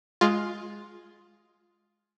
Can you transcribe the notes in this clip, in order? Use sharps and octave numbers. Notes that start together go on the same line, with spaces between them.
G#3 F4